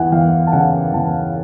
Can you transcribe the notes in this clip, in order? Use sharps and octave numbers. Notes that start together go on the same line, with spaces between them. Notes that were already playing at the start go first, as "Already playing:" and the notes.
Already playing: E2 E3 F#5 G#5
E2 F5 G5
A5
C#3 F#5 G#5
E2 G5 A5